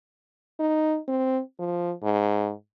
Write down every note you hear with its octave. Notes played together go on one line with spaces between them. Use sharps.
D#4
C4
F3
G#2